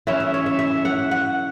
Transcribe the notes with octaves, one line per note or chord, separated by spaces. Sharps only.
E3 C#4 E4 E5
E5
C#5
E5
E5
F#5
F#5